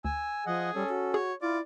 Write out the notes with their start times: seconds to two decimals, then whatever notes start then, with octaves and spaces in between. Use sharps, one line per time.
0.05 D2 G#5 E6
0.46 F3 G#4 D#5 F#5
0.75 G3 C#4 A4
0.89 F#4
1.14 G#4 C#5
1.42 E4 F4 D5